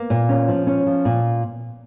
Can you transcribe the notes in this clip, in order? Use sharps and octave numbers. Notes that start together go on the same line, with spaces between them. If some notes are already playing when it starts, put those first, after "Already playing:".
Already playing: A#3
A#2
C#4
F3
C#4
F3
A#2